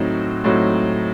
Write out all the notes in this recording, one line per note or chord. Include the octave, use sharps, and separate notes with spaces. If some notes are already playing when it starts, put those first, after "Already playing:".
Already playing: A2 F#3 C4 D#4 F#4
A2 F#3 C4 D#4 F#4